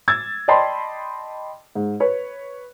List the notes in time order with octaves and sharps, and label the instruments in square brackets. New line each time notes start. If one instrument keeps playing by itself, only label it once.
[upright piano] E6 G#6 A6
D5 D#5 G5 A5 B5 C6
G#2
B4 C#5